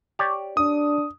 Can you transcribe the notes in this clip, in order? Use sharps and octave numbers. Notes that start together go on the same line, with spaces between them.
G4 C#5 D5
D4 D#6